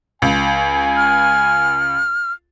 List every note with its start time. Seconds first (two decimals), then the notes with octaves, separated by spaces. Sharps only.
0.22 C#2 G#5
0.97 F6